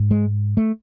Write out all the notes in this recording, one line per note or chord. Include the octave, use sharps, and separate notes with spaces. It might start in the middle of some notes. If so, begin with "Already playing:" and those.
Already playing: G#2
G#3
A3